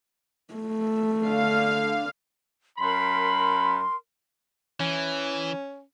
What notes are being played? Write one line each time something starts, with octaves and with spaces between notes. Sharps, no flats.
A3
D3 F5
F#2 A#4 B5 C6
E3 C#4